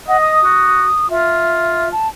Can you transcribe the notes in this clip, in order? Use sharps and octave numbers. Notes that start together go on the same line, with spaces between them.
D#5 F#5
D#6
F#4
F4 E5
A5